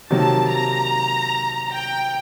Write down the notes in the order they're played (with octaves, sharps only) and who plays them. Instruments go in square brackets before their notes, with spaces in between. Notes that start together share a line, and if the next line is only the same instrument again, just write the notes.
[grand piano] C3 D#3 F#3 A#3 [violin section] A5
[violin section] A#5
G5